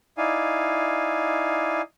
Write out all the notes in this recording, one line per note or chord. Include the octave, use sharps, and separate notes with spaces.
D#4 E4 D5 F5 G#5